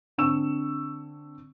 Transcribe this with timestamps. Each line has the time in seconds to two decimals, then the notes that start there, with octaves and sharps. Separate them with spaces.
0.18 D3 C4 D4 C#6 E6 E7